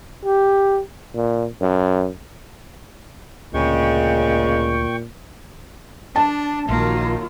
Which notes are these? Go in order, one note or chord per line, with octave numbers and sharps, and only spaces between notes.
G4
A#2
F#2
D2 A#2 C#3 G#3 G5 C#6
D4 A5
A#1 D#3 F#3 A#3 F4